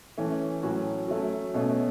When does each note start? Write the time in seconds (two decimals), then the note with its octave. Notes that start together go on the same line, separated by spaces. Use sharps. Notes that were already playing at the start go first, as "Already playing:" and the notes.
0.18 E3 A3 C#4
0.63 A2 F#3 C#4 F#4
1.08 F#3 A3 C#4 F#4
1.54 B2 A3 C#4